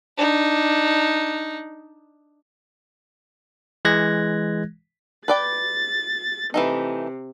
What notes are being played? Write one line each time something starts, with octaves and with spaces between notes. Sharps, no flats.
D4 D#4
E3 G#3 F#6 G#6 A#6
B4 D5 G5 A6
C3 E3 A3 D#4